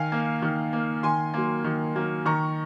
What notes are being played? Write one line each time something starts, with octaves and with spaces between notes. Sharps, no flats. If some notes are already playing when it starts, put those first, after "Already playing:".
Already playing: D#3 F5 G#5
A#3
D#3
A#3
D#3 G#5 C6
F#3 A#3
D#3
F#3 A#3
D#3 A#5 C#6